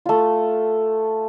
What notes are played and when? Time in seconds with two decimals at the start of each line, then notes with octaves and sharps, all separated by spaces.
0.06 A3 F4